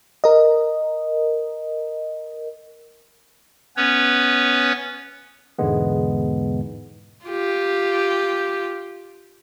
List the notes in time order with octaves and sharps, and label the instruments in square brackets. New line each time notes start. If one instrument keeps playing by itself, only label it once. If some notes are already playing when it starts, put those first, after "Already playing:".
[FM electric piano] A#4 D#5
[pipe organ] B3 C#4 B4 C#5
[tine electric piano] E2 G#2 B2 D3 G#3 B3
[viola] F4 G4